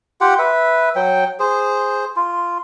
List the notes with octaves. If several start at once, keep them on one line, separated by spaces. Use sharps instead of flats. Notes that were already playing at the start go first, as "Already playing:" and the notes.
F4 G4 F#5 G5
B4 E5
F#3 G5
G#4 C5
F4